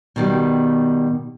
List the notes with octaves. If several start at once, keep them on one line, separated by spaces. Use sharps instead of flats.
B2 D#3 G3